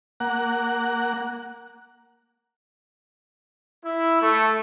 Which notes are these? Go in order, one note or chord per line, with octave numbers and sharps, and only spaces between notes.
A#3 F#5
E4
A3